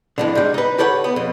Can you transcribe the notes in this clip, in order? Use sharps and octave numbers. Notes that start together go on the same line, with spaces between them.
F2 A2 D3
G#2 G3
D#4 B4
G4 A4 B4 C#5 F#5
B3
F2 B2